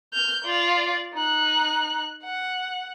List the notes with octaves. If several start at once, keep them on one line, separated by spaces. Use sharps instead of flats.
F6 G6
F4 D5
D#4 F#6
F#5